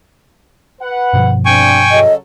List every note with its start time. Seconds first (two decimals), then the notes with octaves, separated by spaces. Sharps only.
0.81 B4 F#5
1.13 G2 B2 F3
1.46 C3 C4 D4 G5 G#5 C#6
1.91 C#3 F#3 A4 D#5